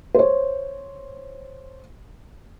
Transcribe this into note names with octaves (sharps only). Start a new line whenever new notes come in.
C5 C#5